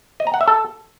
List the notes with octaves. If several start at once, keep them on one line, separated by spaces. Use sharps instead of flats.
D#5
A#5
F#5
E5
A4